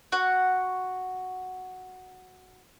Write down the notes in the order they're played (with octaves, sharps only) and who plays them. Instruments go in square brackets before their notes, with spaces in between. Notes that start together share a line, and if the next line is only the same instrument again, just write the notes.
[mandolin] F#4 F#5